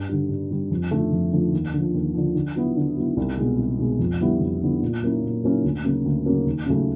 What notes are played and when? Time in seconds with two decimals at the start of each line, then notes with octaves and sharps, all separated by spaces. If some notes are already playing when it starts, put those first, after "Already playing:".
Already playing: G2
0.09 D3 G3
0.29 G2
0.51 D3 G3
0.71 F2
0.91 D3 F3 A3
1.12 F2
1.32 D3 F3 A3
1.52 D#2
1.73 D3 F3
1.94 D#2
2.14 D3 F3
2.35 D3
2.55 F#3 B3 E4
2.76 D3
2.96 F#3 B3 E4
3.17 C2
3.37 B2 G#3
3.58 C2
3.79 B2 G#3
3.99 F2
4.20 D3 G3 B3 E4
4.41 F2
4.62 D3 G3 B3 E4
4.82 A#2
5.03 F#3 A#3 C#4 E4
5.23 A#2
5.44 F#3 A#3 C#4 E4
5.64 D2
5.84 C#3 F#3 A#3 C#4
6.05 D2
6.26 C#3 F#3 A#3 C#4
6.46 D#2
6.66 C#3 F#3 A3